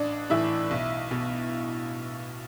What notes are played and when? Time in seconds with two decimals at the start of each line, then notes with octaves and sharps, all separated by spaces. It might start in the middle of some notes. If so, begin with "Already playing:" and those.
Already playing: A1 D4 D5
0.30 A2 E3 E4 E5
0.71 B1
1.11 B2